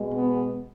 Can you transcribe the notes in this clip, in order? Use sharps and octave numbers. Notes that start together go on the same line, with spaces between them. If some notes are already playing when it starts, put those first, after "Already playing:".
Already playing: B2 G#3
B3